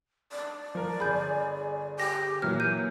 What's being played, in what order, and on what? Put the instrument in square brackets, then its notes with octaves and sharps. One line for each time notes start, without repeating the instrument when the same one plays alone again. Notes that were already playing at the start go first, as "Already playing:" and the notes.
[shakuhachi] D5
[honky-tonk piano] F3 A#4
[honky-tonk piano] G1 G#4 [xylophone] B5 G6
[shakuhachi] G4 [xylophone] A#6
[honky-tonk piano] A#2 E3 F#3 [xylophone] F6
[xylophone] G6 D#7